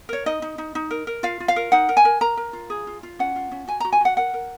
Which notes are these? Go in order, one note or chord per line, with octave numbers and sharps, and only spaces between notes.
A#4 C#5
D#4 D#5
D#4
D#4
D#4
A#4
A#4
F4 F5
F4
F5
A#4
D#4 F#5
A#4
G#5
A#4
A#4 A#5
A#4
F4
G#4
F4
F4
C#4 F#5
F4
C#4
F#4 G#5
F#4 A#5
G#5
F#4 F#5
A#4 F#5
A#4